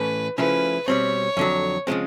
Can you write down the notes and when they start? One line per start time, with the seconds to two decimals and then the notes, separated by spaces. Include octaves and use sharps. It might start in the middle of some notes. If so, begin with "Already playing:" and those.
Already playing: A2 E3 A3 C#4 B4
0.37 C#3 F3 A3 C#4 E4 B4
0.87 B2 G3 C4 C#5
1.37 F2 D3 F#3
1.87 C#3 F3 G#3 C4